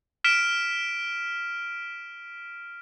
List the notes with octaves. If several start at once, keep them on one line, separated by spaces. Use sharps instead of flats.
F6 B6 D7 E7